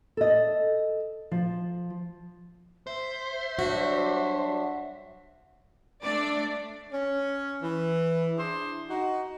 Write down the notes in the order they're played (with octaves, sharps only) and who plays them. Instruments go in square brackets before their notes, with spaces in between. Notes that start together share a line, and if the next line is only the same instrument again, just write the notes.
[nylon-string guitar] A4 D#5
F3
[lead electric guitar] C5 [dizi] E5
[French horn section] F#3 G3 D4 [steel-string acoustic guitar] F#4
[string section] A3 D4 D5
[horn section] C#4
E3
D4 E4 G#4 C5
D#4 F#4